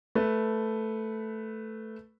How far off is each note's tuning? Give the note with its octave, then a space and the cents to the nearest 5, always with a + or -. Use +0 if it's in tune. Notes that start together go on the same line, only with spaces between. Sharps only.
A3 +0 B4 +0